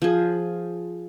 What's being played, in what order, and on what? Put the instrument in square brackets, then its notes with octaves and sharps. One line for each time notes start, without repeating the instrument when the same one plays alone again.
[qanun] F3 G#4